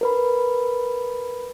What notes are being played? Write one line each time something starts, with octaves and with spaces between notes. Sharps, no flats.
A#4 B4 B5